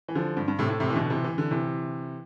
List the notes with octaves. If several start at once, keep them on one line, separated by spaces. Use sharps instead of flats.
E3
D3 F3
G2
G2
A2 C3
A2
A2 C3
E3
B2 D3
C3 E3
E3
D3
C3 E3